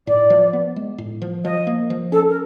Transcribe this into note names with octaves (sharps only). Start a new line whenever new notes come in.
A2 D5
F3
B3
G#3
A2
F3
F3 D#5
A#3
F3
C#4 A4
A#4